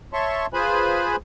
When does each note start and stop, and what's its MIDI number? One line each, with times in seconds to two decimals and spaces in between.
0.13 0.46 73
0.13 0.46 76
0.13 0.46 81
0.13 0.46 84
0.13 0.46 85
0.53 1.16 65
0.53 1.16 68
0.53 1.16 71
0.53 1.16 72
0.53 1.16 80
0.53 1.16 83